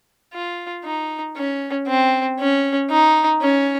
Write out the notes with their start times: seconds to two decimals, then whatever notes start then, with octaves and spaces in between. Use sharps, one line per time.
0.33 F4
0.84 D#4
1.36 C#4
1.87 C4
2.39 C#4
2.90 D#4
3.41 C#4